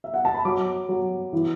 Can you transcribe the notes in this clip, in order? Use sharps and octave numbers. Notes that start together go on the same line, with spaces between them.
E5
F#5
A5
B5
F#3 D6
F#3
E3